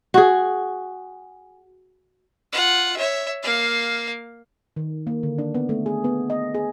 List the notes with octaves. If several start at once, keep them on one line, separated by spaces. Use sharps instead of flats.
F#4 G#4
F4 F#5
C#5 E5
A#3 F5
D#3
A#3
D3
D4
B3
A3
G#4
B3
D#5
G#4